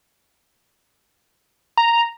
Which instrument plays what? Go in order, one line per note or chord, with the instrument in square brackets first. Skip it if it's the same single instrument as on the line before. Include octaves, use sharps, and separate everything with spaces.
[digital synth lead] A#5